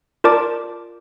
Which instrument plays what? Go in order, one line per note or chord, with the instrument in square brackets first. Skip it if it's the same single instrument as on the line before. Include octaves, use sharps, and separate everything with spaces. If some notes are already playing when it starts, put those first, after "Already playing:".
[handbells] F4 A#4 D5 A5 D6